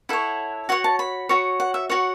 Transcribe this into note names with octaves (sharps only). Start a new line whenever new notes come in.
E4 A4 C#5 F#5
F#4 C#5 F#5
A5
B5
F#4 C#5
F#5
E5
F#4 C#5 F#5